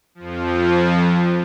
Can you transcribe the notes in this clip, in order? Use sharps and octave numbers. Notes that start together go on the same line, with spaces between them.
F2 F3